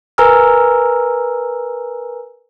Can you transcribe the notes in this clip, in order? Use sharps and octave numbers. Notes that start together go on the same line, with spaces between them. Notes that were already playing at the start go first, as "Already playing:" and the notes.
A#4 B4 G#5 A#5 E6 F6